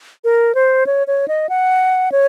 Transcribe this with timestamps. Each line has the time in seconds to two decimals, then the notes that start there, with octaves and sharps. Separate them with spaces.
0.24 A#4
0.55 C5
0.86 C#5
1.07 C#5
1.28 D#5
1.49 F#5
2.12 C#5